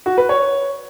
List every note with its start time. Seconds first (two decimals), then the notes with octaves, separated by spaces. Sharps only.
0.06 F#4
0.18 B4
0.29 C#5